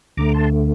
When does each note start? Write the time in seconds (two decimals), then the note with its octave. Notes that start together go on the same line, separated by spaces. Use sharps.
0.17 D2 D3 A3 A#5 D6
0.34 A5 C6